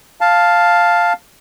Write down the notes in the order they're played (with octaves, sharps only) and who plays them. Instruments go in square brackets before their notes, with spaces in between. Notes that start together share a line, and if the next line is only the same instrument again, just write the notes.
[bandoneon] F5 A5